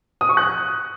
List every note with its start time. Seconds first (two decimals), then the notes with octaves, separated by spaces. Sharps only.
0.21 D#6
0.29 C#6
0.37 F#6